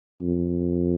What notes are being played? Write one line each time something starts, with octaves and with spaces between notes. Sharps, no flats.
F2